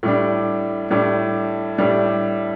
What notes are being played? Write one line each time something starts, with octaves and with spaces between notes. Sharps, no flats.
A2 G3 D4
A2 G3 D4
A2 G3 D4